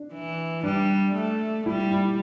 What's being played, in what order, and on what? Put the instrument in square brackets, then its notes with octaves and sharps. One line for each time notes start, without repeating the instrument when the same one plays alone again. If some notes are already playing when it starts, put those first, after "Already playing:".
Already playing: [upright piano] D4
[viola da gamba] E3
[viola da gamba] G3 [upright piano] D4
[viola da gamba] A3
[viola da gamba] G3 [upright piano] E4
[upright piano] E4